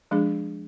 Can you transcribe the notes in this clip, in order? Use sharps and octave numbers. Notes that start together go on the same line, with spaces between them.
F3 G#3 D4 G#4